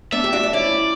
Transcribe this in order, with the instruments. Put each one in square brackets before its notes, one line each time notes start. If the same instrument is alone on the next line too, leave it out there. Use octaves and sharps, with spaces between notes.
[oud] B3 D4 [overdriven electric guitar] E5
[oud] G4
D4 F#4
D4
[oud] C#4 E4 [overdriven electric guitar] D5